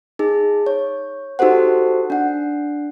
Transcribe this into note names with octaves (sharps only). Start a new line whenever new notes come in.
D#4 G#4
C#5
D#4 F#4 G4 A4 C5 F#5
D4 F#5